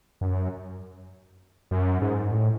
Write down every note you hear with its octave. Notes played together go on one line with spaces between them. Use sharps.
F#2
F#2
G#2
A2